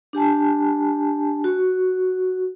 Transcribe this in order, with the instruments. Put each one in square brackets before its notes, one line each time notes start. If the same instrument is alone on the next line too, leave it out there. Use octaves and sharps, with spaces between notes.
[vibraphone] D4 G4 G#5 A5
F#4